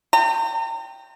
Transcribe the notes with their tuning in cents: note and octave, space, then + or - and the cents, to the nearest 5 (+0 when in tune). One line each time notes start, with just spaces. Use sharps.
G5 +0 A#5 -45